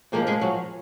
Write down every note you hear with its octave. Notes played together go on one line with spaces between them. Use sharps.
A#2 F3 G#3 A#3 A#4
G#3 G#4
F#3 F#4